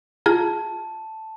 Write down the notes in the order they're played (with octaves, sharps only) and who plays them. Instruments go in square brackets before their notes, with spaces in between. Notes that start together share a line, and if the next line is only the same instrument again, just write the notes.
[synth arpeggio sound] F4 G#4 A#5 [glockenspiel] A5